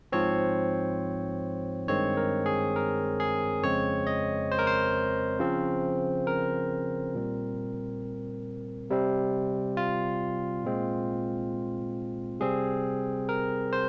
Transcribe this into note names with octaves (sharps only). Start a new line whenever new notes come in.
G#2 F3 C4 C#5
G2 D#3 G#3 C4 C#5
A#4
G#4
A#4
G#4
F2 C#3 G#3 C4 C#5
D#5
C5
A#4
C5
C#3 F3 C4
A#4
A#2 G3 C4
C3 G3 C4
F4
A#2 G#3 C4
C3 G3 C4 G#4
A#4
C5